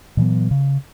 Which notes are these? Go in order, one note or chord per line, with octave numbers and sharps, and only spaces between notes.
A#2 E3 F#3 B3
C#3